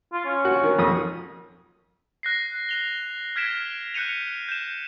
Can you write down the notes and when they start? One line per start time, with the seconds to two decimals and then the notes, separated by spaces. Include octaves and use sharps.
0.13 F4
0.25 C#4
0.45 F#4
0.63 D#3
0.79 F2 D#6
2.23 F#6 A#6 C7
2.69 F#6 F7 G7
3.36 F6 G#6 B6 D7 E7
3.94 F#6 G6 C#7 D#7 F7
4.49 G6 E7